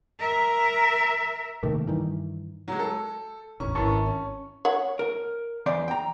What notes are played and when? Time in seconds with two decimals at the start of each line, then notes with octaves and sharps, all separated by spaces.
0.19 A#4 E5
1.63 C3 D#3 A3 A#3
1.87 G2 D#3 E3
2.68 F#3 G#3
2.79 A4
3.60 E1 A1 C#4 C#6
3.75 G#1 F#2 E3 A5 C#6
4.06 C#4
4.65 C#5 F#5
4.99 A#4
5.66 E2 C5 D5
5.88 G5 A#5